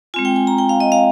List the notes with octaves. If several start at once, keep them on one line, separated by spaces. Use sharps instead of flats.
G#3 C4 F4 G#5
G5
G#5
A#5
G5
F5
D#5
F5